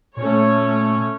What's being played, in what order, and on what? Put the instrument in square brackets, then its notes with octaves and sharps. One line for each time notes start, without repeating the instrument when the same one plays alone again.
[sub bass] A#2 [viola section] A3 C#4 C#5